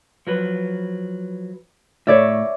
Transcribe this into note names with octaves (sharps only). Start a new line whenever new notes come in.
F3 F#3 B4
A2 C#5 D5 E5